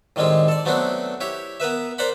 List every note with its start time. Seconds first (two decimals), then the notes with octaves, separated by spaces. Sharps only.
0.16 A2 D#3 G3 G#3 C4
0.48 A4 D5
0.65 F#3 A3 B3 C4 D4 F#4
1.21 E4 G4 C#5
1.60 B3 A#4 B4 E5
1.98 A#4 C5 D5 F#5 B5